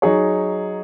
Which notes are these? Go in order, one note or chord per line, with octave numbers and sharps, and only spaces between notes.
F#3 D#4 G#4 C#5